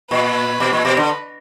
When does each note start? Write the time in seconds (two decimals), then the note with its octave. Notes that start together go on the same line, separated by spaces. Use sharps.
0.11 A#2 B4
0.60 B2
0.73 A#2
0.85 B2
0.97 D3